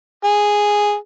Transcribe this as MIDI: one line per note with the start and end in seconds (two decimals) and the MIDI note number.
0.25 0.95 68